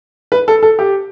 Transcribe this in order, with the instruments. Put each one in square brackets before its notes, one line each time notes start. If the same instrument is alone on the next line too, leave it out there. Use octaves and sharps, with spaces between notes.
[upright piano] B4
A4
A4
G4